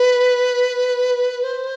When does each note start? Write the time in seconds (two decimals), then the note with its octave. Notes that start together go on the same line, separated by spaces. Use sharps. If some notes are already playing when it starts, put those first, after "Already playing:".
Already playing: B4
1.43 C5